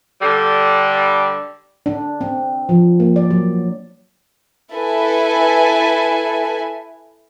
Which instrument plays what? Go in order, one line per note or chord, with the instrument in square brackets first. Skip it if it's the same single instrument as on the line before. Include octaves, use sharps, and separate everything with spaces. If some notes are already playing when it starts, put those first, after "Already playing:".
[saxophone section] D3 G3
[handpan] D4
C4
F3
A#3
D5
F#3
[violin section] E4 A4 B4 G#5